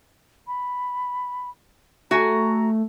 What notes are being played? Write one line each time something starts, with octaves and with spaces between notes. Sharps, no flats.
B5
A3 F#4 G#5 A#5